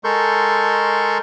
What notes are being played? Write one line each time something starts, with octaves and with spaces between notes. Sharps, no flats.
G#3 A4 A#4 C6 C#6 G6